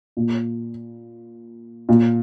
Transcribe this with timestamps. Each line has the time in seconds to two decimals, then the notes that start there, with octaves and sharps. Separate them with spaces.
0.17 A#2
1.89 A#2